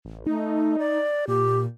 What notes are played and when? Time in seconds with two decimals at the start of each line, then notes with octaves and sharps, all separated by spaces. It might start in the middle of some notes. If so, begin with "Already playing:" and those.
0.05 A1
0.27 A3 D#4
0.79 D5
1.28 A#2 G4